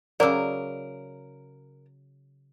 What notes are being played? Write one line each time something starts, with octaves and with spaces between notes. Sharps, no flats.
C#3 F#3 A#4 D5 D6 E6